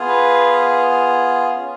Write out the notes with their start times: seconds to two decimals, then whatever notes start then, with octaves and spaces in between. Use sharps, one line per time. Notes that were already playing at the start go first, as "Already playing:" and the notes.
Already playing: B3 F4 G#4
0.08 B4
1.54 C#4 F4 G#4